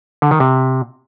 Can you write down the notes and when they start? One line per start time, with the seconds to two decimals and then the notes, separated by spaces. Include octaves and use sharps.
0.22 D3
0.31 D#3
0.40 C3